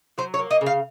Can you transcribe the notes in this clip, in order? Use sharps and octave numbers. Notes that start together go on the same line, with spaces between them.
F#3 C5
C#5
A#3
D#5
C#3
F5